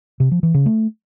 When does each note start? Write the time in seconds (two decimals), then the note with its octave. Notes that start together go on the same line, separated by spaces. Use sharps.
0.20 C3
0.31 F3
0.43 E3
0.54 C#3
0.66 A3